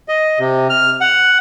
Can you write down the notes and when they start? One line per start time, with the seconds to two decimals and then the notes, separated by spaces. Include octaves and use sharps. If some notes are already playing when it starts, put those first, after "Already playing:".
0.08 D#5
0.39 C3
0.70 F6
1.01 F#5